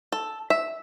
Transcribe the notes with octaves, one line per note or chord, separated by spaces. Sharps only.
A4
E5